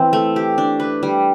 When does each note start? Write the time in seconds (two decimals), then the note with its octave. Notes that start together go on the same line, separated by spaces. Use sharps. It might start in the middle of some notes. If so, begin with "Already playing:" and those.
Already playing: E3 C4 E4
0.13 A3
0.36 G4
0.58 D4
0.80 B4
1.03 G3